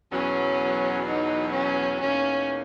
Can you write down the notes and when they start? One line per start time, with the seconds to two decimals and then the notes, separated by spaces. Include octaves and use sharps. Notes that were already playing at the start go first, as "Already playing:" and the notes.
0.12 E2 B2 F#3 C#4
1.07 D#4
1.53 C#4
2.01 E2 B2 A#3 C#4 D#4